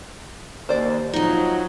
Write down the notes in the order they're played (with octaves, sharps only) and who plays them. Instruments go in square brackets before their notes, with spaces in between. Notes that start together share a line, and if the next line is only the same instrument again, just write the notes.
[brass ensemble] D#2 [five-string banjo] C5 D5
[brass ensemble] F3 F#3 [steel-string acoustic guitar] D#4 D#5